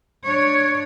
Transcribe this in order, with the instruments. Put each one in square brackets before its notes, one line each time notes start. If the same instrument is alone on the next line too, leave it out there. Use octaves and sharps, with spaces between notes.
[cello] D4 C#5